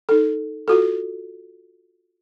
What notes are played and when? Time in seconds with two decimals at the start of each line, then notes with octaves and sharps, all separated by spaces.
0.09 D#4 A4
0.68 F4 F#4 A4